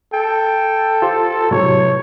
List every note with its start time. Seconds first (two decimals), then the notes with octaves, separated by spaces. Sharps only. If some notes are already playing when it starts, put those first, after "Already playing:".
0.13 A4 G5
1.02 F4 G4 C5
1.51 A2 C3 F#3 C#5